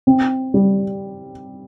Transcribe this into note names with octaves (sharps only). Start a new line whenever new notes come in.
C4
G3